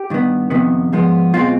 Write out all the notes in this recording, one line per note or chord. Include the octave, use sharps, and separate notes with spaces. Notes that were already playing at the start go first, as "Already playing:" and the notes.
Already playing: G4
G2 D#3 B3
F2 C3 D#3 B3
G#2 F3 G#3 B3
B1 B2 G#3 C4 F4